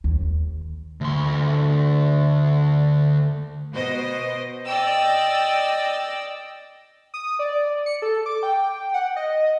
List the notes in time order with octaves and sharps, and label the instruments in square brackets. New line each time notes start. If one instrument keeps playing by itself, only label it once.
[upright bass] D#2
[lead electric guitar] D2 C6
[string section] B2 C5 D#5
D5 D#5 G5 E6
[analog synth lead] D#6
D5
C#7
A4
D6
G5
F#5
D#5